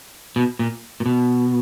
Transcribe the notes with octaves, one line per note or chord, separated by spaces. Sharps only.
B2
A#2
A#2
B2